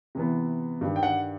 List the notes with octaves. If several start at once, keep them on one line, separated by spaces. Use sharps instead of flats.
C3 E3 B3
G2 D#3 G3
G5
F#5